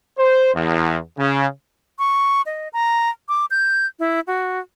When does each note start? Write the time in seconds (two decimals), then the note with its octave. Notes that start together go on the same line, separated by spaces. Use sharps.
0.19 C5
0.55 E2
1.19 C#3
1.99 C#6
2.46 D#5
2.73 A#5
3.29 D6
3.51 G6
3.99 E4
4.27 F#4